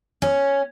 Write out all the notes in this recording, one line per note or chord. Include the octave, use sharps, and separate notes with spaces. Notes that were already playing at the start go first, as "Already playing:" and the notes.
C#4